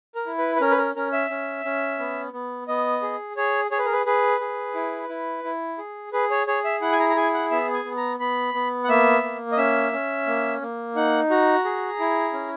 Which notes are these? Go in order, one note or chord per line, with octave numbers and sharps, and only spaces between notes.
A#4
E4
B4
B4
C#4 A#4
B4
A#4
C#4 A#4
E5
C#4
C#4
B3
B3
B3 D#5
G#4
G#4 C#5
G#4 C#5
B4
A#4
B4
G#4 B4
G#4
E4
E4
E4
G#4
G#4 B4
C#5
G#4 C#5
E5
E4 F#5
G#5
A#5
A#5
G#4 G#5
F#5
B3 E5
G#5
B3
A#5
B3 B5
B3
F#5
A#3 E5
A#3
D#5
C#4 E5
C#4
A#3
A#3
D#4 F#5
F#4 A#5
G#4
E4
C#4